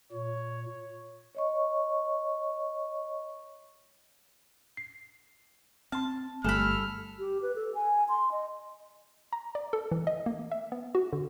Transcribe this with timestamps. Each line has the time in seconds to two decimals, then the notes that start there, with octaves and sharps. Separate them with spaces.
0.12 A#2 C#5
1.35 C#5 D#5 C#6
4.77 C7
5.92 C4 A5 C6 F6
6.44 G1 G3 A3 A4 G#5 B5 F6 F#6
7.19 G4
7.42 B4
7.56 A4
7.75 G#5
8.09 C6
8.32 D#5
9.33 A#5
9.55 D5
9.73 A4
9.91 E3
10.07 D#5
10.26 A#3
10.51 E5
10.72 B3
10.95 F#4
11.13 D3